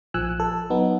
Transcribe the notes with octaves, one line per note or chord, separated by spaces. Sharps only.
A#1 F3 G#5 E6 F#6
A4
F#3 B3 D#4